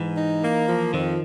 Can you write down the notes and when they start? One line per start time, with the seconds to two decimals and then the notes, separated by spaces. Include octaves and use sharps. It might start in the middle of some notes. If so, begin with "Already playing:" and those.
Already playing: G#2 E3
0.18 D#4
0.43 A#3
0.68 F3
0.93 F2 D#3